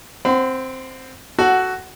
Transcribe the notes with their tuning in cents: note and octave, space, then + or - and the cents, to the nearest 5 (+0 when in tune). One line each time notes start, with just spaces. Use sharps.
C4 +0 F#5 +0 C6 -45
F#4 +10 A4 +0 F#5 +0